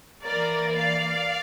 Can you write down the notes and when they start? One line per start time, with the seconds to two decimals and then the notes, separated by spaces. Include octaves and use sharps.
0.24 E3 A#3 A#4 D5
0.76 D5 F5